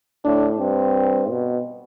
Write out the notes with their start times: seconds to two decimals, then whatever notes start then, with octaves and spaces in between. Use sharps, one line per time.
0.25 A2 D4
0.60 G2 C4
1.30 B2